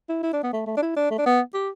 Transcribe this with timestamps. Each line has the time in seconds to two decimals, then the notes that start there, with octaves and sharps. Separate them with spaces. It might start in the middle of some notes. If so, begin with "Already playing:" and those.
0.09 E4
0.23 E4
0.33 D4
0.43 B3
0.53 A3
0.67 A3
0.77 D4
0.82 E4
0.96 D4
1.10 A3
1.18 D4
1.26 B3
1.54 G4